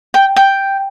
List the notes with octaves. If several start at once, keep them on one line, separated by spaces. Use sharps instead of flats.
G5
G5